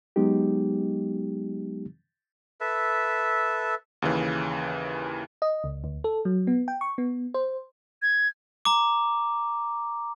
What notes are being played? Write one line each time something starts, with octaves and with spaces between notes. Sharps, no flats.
F#3 G#3 B3 D#4 G4
A4 B4 E5
D#2 C#3 E3
D#5
C#2
D2
A4
F#3
B3
G5
C#6
B3
C5
G#6
A#5 D6